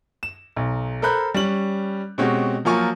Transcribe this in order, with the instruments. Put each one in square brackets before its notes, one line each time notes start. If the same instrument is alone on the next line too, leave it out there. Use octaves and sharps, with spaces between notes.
[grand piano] E7
B1
A4 A#4 C5 B5 F#6 G6
G3 C#4 F#7
B2 G#3 C4 C#4 F#4 G4
F3 F#3 A#3 F4 G#5 C#6